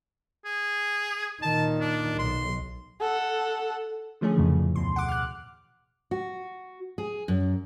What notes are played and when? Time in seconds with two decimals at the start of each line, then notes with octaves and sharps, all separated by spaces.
0.45 G#4
1.42 A#2 D#3 A5
1.81 D4
2.19 B1 C6
3.01 A4 F#5
4.21 D3 F3 A3 C#4 G#4
4.36 F2 A2 C#3 E3 A3
4.59 E2
4.76 D2 B2 C6
4.96 F#5 D6
5.08 F6 F#6
6.11 F#4
6.98 G#4
7.28 F#2